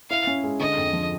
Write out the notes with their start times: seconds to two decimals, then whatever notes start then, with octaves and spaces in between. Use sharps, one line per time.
0.10 E4 F5
0.27 C#4
0.44 G#3
0.60 D3 D#5
0.77 F2
0.93 F3